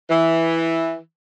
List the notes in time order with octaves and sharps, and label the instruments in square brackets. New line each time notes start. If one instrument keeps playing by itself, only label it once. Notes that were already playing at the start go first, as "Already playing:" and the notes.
[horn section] E3